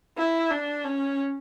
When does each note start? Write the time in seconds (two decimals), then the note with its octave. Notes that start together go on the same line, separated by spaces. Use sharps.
0.18 E4
0.51 D4
0.84 C#4